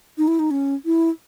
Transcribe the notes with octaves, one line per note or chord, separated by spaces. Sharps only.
D#4
E4
D#4
C#4
E4